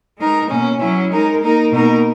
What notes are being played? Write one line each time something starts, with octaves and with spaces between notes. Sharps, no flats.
G#3 D#4 A#4
B2 A#3 C#4
F#3 C#4 E4
G#3 D#4 A#4
A#3 D#4 A#4
B2 A#3 D#4 A#4